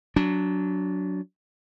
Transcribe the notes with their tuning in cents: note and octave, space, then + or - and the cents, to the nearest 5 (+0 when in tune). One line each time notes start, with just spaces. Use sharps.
F#3 +0 D4 -20